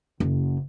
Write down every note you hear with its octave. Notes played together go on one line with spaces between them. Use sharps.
F#1